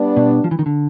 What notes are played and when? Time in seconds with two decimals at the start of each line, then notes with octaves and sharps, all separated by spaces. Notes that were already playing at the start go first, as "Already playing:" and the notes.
Already playing: G3 B3 D4
0.17 B2
0.44 F3
0.51 E3
0.59 D#3
0.66 D3